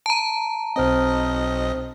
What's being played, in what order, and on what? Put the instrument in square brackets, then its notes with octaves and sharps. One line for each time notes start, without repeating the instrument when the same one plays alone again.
[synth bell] A5 A#5
[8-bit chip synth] B1 D#5 [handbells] C4 C5 F6